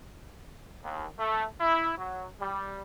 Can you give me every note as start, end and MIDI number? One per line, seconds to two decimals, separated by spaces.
0.82 1.05 39
1.17 1.43 57
1.60 1.92 64
1.96 2.26 54
2.38 2.82 55